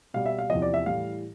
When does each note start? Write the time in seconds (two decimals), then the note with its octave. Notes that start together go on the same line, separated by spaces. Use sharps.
0.14 B2 G3 F5
0.26 E5
0.39 F5
0.50 E2 C3 F3 D#5
0.62 D5
0.74 E5
0.86 A2 E3 G3 F5